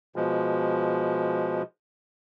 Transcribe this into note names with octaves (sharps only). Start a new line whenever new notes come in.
B2 F3 G#3